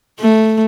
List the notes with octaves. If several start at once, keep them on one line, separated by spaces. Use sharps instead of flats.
A3